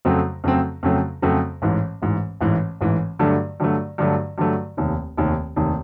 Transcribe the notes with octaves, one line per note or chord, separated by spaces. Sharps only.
F2 C#3 F#3 A3 C4
F2 C#3 F#3 A3 C4
F2 C#3 F#3 A3 C4
F2 C#3 F#3 A3 C4
A1 G#2 E3
A1 G#2 E3
A1 G#2 E3
A1 G#2 E3
G2 D3 F#3 A3
G2 D3 F#3 A3
G2 D3 F#3 A3
G2 D3 F#3 A3
F1 D#2 D#3
F1 D#2 D#3
F1 D#2 D#3